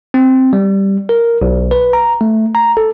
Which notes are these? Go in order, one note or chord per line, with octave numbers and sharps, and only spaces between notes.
C4
G3
A#4
B1
B4
A#5
A3
A#5
A4